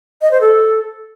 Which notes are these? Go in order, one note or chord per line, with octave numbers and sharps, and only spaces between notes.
D#5
C5
A4